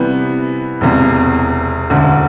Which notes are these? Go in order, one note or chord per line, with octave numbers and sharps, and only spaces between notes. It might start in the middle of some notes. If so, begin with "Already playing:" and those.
Already playing: C3 E3 G3 B3
E1 E2 C3
E1 D2 D3